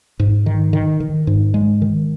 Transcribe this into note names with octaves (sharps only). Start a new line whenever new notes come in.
G#2
D#3
D#3
D#3
G#2
G#3
D#3